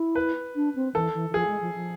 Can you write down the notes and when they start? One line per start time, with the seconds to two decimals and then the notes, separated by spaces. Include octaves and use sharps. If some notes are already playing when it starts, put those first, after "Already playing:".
Already playing: E4
0.15 B4
0.55 D4
0.75 C4
0.95 E3 A4
1.14 E3
1.30 E3
1.34 F3 G#4
1.47 G#3
1.61 F3
1.74 F3